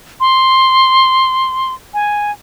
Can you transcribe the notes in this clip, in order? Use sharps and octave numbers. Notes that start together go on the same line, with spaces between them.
C6
G#5